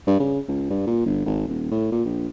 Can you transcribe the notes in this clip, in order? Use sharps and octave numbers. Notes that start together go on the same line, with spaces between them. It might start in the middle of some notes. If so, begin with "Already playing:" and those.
G2
C#3
C#2
G2
A#2
G1
G#1
D#1
A2
A#2
A#1